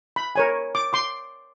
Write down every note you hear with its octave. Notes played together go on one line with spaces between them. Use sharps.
B5
A#4 C#5 G#5
D6
C6 D6